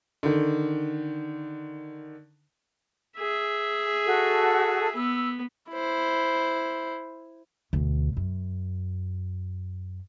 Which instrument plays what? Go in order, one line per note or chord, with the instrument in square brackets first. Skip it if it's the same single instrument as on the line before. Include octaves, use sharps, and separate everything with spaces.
[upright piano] D3 D#3
[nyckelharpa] G#4 E5
[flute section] F#4 A4
[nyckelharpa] B3 [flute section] E6
[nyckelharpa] E4 C5
[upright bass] D2 B2
F#2